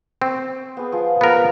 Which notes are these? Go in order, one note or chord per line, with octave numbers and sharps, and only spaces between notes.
C4 C#6
B3 G#4
F3 G#4
B3 A#4